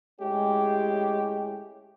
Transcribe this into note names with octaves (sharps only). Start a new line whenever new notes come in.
A2 G#3 C#4 G4